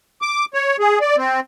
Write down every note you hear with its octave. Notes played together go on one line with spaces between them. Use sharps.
D6
C#5
G#4
D5
C4